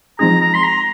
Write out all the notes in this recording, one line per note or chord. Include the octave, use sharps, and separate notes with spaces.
F3 G#3 C4 D#4 G#4 A#5
A#5
C6
A#5